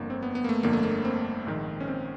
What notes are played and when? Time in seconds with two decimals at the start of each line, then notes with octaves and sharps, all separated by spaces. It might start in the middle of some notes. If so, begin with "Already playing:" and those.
Already playing: G1 F2 D3 A#3
0.10 C4
0.22 B3
0.35 B3
0.44 A#3
0.49 A3
0.63 G1 F2 D3 A#3
0.73 A3
0.83 A#3
1.05 C4
1.47 A#1 G#2 D#3
1.80 C#4
1.88 C4